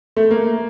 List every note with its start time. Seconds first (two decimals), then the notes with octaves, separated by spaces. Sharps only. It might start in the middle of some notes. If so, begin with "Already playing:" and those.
0.17 A3
0.31 A#3